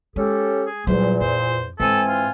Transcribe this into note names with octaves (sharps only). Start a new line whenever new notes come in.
G#3 C#4 G4 A4
G#4
E2 A#2 F#3 G3 C5
F2 C5
G#2 E3 C4 A4 G#5
F4